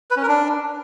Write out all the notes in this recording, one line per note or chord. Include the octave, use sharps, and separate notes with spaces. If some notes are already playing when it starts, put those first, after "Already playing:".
B4
C#4
A#4
D4